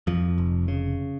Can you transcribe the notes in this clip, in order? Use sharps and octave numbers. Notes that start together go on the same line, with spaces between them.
F2 F3
F1
C#3